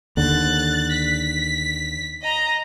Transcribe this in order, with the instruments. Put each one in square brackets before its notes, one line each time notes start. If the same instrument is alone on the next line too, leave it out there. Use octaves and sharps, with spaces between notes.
[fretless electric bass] D#2 D3 [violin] F#6 A6
[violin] B6
D#5 A#5